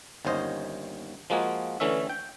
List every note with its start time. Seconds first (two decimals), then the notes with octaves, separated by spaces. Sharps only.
0.25 G1 D#2 C#4 C5 D#5
1.30 F3 G#3 A#3 F#4 G#4
1.80 D3 E3 A3 C#4 E5
2.09 G5